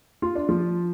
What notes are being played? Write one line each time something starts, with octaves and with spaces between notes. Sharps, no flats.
F4
D4
F3 F4